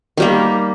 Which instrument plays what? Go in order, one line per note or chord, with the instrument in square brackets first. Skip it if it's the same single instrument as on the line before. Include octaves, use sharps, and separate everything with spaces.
[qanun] D#3 G3 A#3